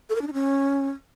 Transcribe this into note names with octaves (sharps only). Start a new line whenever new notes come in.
A4
A#4
D4
D#4
C#4